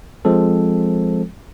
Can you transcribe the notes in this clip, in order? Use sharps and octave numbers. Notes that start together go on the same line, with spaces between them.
F3 G#3 C4 A4